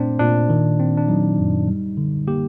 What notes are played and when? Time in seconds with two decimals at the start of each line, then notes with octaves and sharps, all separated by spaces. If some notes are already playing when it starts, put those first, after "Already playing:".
Already playing: A#2 A3 C4 D4 C5 D5
0.19 A#2 D4
0.49 D#3
0.79 C4
0.98 D4
1.08 F#3 D#4
1.39 F#2
1.68 G3
1.97 D3
2.27 A#3 G4